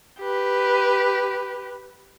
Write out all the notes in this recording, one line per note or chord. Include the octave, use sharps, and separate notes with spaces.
G4 B4